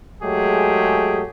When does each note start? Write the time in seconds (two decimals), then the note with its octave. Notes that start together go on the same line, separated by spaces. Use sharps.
0.22 F#3 G#3 A3 G4 G#4